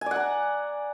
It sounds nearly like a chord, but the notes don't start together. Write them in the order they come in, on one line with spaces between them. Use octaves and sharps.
G#5 D5 F#5 A#5